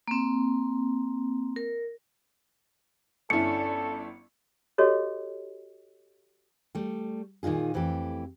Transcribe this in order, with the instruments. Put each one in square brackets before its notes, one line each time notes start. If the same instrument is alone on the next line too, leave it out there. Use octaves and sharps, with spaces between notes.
[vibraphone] A#3 C4
A#4
[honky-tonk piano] G1 E4 [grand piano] C#4 D4 D5 [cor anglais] A4 [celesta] C#7
[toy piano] F#4 G4 A4 C#5 D#5
[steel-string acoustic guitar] G3 A3
A#2 D#3 D#4 F4 G#4
F2 E3 A3 G4